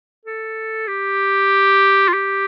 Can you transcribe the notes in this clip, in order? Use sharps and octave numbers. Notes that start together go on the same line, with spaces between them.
A4
G4
F4
G4